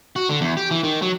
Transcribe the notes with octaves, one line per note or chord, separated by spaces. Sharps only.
F#4
D3
E2
G4
E3
D#3
F#3